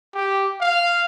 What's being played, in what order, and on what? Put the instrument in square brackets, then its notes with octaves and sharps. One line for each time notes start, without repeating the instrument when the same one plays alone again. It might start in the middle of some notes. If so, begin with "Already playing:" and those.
[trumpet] G4
F5